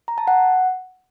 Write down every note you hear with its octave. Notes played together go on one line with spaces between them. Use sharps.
A#5
A5
F#5